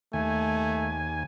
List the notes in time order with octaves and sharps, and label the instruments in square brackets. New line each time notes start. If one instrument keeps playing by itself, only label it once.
[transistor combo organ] D#2 G#5 [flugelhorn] A3